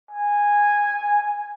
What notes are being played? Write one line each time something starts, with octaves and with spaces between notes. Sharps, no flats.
G#5